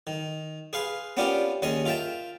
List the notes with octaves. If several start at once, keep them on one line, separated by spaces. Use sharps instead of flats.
D#3
G#4 B4 F5 C6
B3 C#4 D4 F4 G4 A#4
D#2 D#3 C#4 G#4 D#5 D#6
F4 A#4 E5 G5 A5